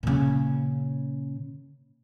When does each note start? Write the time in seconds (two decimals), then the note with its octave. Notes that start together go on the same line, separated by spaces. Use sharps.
0.03 A#2 C#3